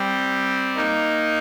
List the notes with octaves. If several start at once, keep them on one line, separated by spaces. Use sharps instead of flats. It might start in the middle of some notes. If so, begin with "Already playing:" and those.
Already playing: G3 C4
A#3 D#4